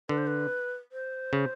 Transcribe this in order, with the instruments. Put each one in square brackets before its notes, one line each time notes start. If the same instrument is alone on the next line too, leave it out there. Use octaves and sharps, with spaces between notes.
[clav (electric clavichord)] D3 [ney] B4
[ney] C5
B4
C5
[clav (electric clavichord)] C#3